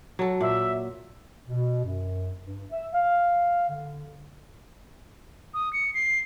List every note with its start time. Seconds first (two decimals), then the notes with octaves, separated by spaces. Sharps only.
0.19 F#3 A4
0.41 A#2 E5
1.47 B2
1.84 F#2
2.42 G2
2.71 E5
2.93 F5
3.69 D3
5.54 D#6
5.73 C#7
5.94 C7